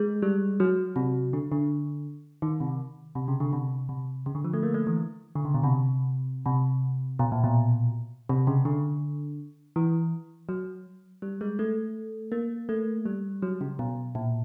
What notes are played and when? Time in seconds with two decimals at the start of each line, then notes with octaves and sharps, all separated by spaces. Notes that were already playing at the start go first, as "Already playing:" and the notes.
Already playing: G#3
0.22 G3
0.60 F#3
0.96 C3
1.33 D3
1.52 D3
2.42 D#3
2.60 C3
3.15 C3
3.28 C#3
3.40 D3
3.53 C3
3.89 C3
4.26 C#3
4.35 D3
4.44 F3
4.53 A3
4.63 A#3
4.74 A3
4.87 E3
5.35 D3
5.45 C#3
5.54 B2
5.63 C3
6.46 C3
7.19 B2
7.32 A#2
7.44 B2
8.29 C3
8.47 C#3
8.65 D3
9.76 E3
10.49 F#3
11.22 G3
11.41 G#3
11.59 A3
12.32 A#3
12.69 A3
13.06 G3
13.42 F#3
13.61 C#3
13.79 B2
14.15 A#2